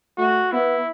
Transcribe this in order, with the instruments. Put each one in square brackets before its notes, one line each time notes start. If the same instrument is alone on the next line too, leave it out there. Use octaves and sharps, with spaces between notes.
[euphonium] A3 [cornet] F#4
[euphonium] B3 [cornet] E4